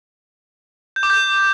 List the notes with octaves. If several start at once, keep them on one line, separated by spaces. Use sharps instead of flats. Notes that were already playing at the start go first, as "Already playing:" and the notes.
G6
D6
G6